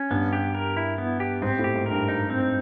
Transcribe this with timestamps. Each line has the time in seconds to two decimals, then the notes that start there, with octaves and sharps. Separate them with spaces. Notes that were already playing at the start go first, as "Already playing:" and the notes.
Already playing: C#4
0.11 G2 B3
0.33 G4
0.55 A#4
0.77 E4
0.98 B3
1.20 G4
1.42 G#2 C4
1.59 A2
1.64 G4
1.75 G#2
1.86 A#4
1.91 G2
2.08 D#4
2.30 C4